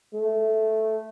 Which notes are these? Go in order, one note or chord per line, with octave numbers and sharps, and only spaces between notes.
A3